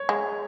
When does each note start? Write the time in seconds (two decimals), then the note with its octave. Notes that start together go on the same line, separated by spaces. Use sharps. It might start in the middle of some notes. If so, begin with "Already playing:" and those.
Already playing: C#5
0.09 G#3